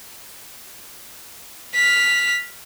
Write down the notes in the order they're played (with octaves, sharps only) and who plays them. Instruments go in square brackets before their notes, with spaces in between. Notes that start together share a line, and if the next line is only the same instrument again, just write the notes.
[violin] F6 B6